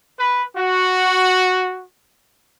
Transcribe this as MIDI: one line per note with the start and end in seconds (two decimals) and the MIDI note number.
0.18 0.43 71
0.55 1.83 66